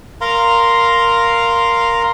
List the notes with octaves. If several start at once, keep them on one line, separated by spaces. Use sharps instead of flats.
A#4 F5 A#5 C6